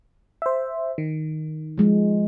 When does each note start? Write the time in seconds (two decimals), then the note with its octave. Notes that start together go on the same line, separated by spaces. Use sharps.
0.42 C5 E5
0.98 D#3
1.78 F3 G#3